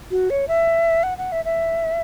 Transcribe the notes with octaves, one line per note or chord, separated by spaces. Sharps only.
F#4
C#5
E5
F#5
F#5
E5
E5